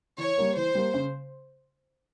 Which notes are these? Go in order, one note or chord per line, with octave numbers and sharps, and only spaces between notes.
E3 C#5
G3 A#3
E3 C5
G3 A#3
C#3